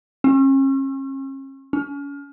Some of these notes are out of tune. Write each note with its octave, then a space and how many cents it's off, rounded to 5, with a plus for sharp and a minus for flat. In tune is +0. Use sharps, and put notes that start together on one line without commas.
C#4 -40
C#4 +35